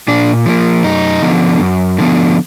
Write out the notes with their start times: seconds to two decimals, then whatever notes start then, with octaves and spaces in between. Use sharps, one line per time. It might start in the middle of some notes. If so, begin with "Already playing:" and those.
0.08 A#2 D4
0.46 F3 A#3
0.84 F#2 D#4
1.22 D3 F3 B3
1.60 F#2
1.99 D3 F3 B3